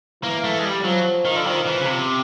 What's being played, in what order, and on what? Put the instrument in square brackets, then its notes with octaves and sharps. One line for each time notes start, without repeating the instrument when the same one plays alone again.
[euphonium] E3 [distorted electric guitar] A#3
[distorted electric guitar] A3
G#3
G3
[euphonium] F3 [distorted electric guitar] F#3
[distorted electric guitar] D#3
D3
[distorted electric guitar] D#3 [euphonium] F3
[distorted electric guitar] E3
C#3
C3